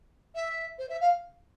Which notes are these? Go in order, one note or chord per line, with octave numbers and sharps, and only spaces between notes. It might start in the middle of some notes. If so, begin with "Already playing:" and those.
E5
C5
E5
F5